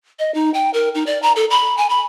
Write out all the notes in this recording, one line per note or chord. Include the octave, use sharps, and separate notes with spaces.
D#5
D#4
G5
A#4
D#4
D5
A#5
A4
B5
G#5
B5